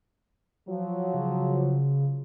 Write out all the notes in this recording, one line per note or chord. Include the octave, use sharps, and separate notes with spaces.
F3 F#3
C#3